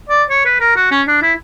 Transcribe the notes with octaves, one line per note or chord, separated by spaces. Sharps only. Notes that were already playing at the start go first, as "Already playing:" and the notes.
D5
C#5
B4
A#4
F#4
C#4
D4
E4